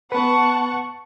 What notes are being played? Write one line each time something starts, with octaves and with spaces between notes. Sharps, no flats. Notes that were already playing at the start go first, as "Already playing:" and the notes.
B3 B4 F#5 A5 C#6